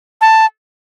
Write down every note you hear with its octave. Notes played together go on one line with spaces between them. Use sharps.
A5